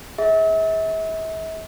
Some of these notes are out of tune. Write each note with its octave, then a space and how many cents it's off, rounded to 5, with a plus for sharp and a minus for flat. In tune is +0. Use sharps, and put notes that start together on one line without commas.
G#4 +0 E5 -40